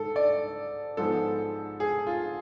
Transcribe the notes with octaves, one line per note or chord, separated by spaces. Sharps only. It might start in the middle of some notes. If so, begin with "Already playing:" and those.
Already playing: G#2 A4
D5
G#2 F3 G#3 B3 A4
G#4
F4